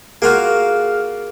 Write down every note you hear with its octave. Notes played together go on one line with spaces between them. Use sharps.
A#3 F4 F#4 G#4 F6